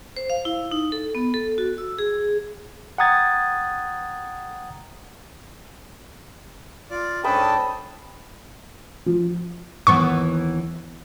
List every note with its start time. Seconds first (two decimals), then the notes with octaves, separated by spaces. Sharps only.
0.17 C5
0.30 F5
0.45 E4
0.71 D#4
0.92 A4
1.15 B3
1.34 A4
1.58 F#4
1.78 E6
1.98 G#4
2.98 F#5 G5 A#5 D#6 G#6 A6
6.91 F4 D5
7.24 G#2 C#4 D4 A4 D#5 G5 A5 B5
9.06 F3
9.87 D#2 E3 B3 C#6